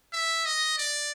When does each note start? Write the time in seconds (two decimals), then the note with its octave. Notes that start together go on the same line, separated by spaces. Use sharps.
0.13 E5
0.46 D#5
0.78 D5